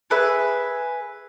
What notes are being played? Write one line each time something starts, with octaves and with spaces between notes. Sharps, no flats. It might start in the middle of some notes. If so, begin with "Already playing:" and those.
G#4 B4 E5